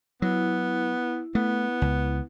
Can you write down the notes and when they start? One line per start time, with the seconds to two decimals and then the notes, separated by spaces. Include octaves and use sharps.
0.22 F#3 B3 E4
1.35 A3 B3
1.82 C#2